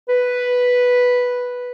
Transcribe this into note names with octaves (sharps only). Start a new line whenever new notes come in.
B4